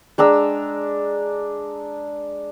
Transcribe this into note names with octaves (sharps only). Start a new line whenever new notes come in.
G#3 D4 A#5 E6